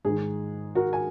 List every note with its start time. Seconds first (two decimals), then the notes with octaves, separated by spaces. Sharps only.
0.05 G#2 D#3 G#4
0.75 F#4 A#4
0.93 G#5